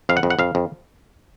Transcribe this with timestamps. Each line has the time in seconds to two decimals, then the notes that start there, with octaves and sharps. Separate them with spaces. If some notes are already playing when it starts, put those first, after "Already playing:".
0.09 F2 F5
0.17 F#5
0.23 F2
0.30 F#5
0.39 F2 F5
0.55 F2